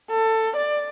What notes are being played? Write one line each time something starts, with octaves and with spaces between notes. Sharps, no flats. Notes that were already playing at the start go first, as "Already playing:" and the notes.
A4
D5